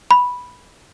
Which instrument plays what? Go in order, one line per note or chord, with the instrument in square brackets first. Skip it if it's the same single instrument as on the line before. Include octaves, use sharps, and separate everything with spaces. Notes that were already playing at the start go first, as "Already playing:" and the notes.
[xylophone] B5